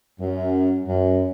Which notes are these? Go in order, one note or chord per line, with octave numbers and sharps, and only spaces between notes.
F#2
F#2